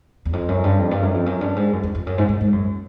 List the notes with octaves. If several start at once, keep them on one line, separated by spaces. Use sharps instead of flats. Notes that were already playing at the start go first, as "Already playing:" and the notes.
E2
F2
F#2
G2
F2
G2
F#2
F2
F#2
G2
G#2
F#2
F2
F2
F#2
G#2
G#2
G#2
F#2